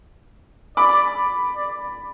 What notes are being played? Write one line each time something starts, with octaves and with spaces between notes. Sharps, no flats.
D5 B5 D6
D5